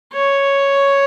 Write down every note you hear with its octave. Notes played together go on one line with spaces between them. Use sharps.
C#5